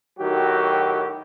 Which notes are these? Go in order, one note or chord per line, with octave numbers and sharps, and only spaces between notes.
A2 D#3 F#3 F#4 G4